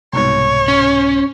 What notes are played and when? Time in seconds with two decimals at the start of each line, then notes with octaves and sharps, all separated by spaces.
0.13 C2 G#2 B2 C#5
0.68 C#4